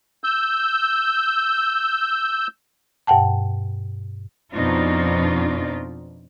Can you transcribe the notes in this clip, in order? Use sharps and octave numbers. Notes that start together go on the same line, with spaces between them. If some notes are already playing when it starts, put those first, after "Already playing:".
E6 G6
G2 B2 F#5 G5 A5
F2 B2 C4 D4 D#4 F4